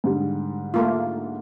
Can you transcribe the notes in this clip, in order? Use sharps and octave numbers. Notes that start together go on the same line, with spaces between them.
G#2 D3 G3
A3 A#3 F4